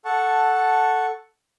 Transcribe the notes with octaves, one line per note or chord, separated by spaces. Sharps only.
A4 F#5 A5 C#6